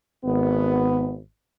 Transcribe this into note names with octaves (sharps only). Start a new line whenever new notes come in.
G#1 B3